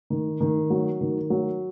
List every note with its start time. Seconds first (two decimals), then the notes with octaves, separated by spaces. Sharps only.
0.10 D#3
0.41 D#3
0.70 F#3
1.01 D#3
1.30 F#3